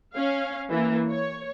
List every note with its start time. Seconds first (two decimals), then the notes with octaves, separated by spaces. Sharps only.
0.14 C#4 F5
0.71 E3 A#3
1.10 C#5